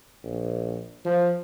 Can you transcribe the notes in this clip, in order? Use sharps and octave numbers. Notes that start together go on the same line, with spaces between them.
A#1
F3